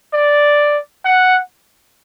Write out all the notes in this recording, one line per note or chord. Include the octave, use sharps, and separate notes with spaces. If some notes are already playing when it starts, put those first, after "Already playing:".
D5
F#5